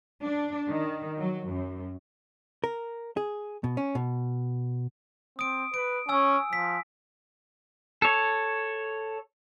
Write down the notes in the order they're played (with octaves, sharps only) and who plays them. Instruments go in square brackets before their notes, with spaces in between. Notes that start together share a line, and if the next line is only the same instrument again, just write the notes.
[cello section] D4
D#3
F#3
F#2
[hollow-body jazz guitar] A#4
G#4
B2
C#4
B2
[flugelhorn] C4 [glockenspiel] D#6 D7
[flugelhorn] B4 [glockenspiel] D7
[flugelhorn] C#4 [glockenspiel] G#5 E6
[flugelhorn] F3 [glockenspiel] B6
[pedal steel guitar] A4 C#5